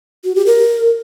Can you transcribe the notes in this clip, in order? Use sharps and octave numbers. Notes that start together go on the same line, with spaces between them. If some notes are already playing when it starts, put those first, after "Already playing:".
F#4
G4
A#4